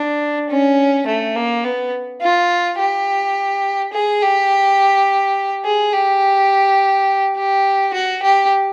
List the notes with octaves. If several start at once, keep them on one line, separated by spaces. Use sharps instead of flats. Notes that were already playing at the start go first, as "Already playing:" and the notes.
Already playing: D4
C#4
A3
A#3
B3
F4
G4
G#4
G4
G#4
G4
G4
F#4
G4